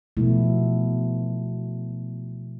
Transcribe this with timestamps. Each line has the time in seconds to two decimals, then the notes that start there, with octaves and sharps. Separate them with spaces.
0.17 B2 F3 A3 B3 E4